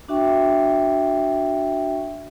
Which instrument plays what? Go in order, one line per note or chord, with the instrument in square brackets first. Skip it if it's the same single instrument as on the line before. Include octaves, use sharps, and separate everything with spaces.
[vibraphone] D4 F#4 E5 G5 C#6